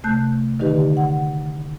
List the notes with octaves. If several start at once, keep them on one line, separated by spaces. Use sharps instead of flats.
C3 A3 A5 F#6 G6
D3 D#3 D#4 G4 B4
F#5